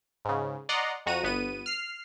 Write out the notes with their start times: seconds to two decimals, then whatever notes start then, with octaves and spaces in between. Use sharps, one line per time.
0.25 G#2 C#3
0.69 D5 D#5 F#5 A#5 C6
1.06 F2 F#4 A#5 D#7
1.23 G1 B3 D#7
1.66 F6 C7